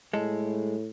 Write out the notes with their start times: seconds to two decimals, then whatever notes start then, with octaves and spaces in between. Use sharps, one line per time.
0.13 A2 G#3 A4